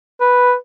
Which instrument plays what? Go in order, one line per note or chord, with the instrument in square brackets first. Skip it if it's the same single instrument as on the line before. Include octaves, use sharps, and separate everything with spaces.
[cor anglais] B4